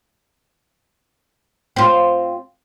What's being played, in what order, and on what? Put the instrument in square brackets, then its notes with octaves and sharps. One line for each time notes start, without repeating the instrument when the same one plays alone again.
[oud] C4 F4